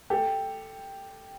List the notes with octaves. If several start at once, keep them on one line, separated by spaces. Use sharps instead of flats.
G4 A4